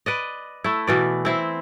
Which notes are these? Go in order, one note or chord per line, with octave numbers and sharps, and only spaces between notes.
B4 D5 D#5
A3 E4
B2 E3 D5
C4 E4 C5